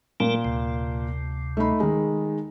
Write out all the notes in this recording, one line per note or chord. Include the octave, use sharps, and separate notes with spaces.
A#2 G3 A3 A#4
D2 C3
A3 D#4 B5
D#3 G#3